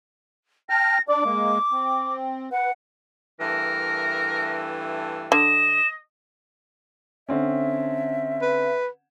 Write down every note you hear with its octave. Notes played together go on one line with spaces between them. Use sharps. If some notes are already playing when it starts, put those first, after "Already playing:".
G5 A5 F6 A#6
D4 D5 D6
G#3 A#3
C4
B4 F#5
G2 E3 A3 A#4
D3 D#5 E7
D3 C4 C#4 E5
B4